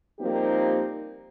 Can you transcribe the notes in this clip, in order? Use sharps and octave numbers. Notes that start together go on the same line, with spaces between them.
F3 G3 A#3 C4 D#4 G4